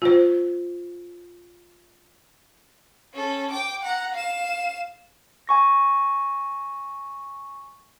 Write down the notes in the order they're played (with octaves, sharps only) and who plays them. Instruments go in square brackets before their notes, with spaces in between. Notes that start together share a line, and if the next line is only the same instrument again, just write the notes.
[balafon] F4 C5
[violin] C#4 A4
G5 D6
F#5 A#5
F5 E7
[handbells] G#5 C#6 A#6